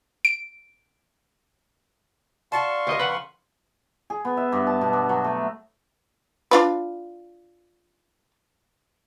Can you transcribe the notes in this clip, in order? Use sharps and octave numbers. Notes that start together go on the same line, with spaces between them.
D7
D4 F#4 A4 F5 A5 C6 C#6
D2 G4 A#4 D#5
F2 C#3 B4 F#5
G#4
B3
E5
G2
A5
B2
G2
F#3
A3
D4 F4 B4